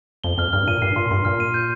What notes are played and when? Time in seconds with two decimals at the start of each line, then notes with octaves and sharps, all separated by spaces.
0.24 F2 G7
0.38 F2 F6
0.53 G2 F6
0.68 A#2 D#7
0.82 G2 C7
0.96 A#2 C6
1.11 G2 C6
1.25 A#2 F6
1.40 D#7
1.54 G6